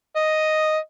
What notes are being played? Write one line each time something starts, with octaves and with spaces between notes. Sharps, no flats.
D#5